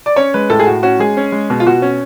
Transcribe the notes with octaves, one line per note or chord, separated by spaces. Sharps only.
D5
C#4 C#5
G#3 B4
A2 A4
G#4
A2 F#4
C#4 F#4
G#3 G#4
C#4
G#3
B2
F4
B2 F#4
C#4